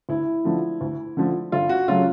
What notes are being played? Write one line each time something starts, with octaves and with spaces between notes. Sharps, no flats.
D2 E4
D3 F3 A3
D2
D3 F3 A3
G1 F4
F#4
C#3 F#3 A3 F4